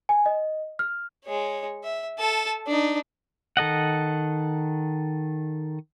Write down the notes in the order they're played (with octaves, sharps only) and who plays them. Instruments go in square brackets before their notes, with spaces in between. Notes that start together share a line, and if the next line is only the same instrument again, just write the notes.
[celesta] G#5
D#5
F6
[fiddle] G#3 C#5
E5
A4 A5
D4 D#4
[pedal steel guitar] D#3 A4 D#5 F#5